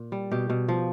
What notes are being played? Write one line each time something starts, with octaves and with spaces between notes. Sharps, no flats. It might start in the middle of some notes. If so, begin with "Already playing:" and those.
Already playing: A#2
G3
B2 G4
B2
F3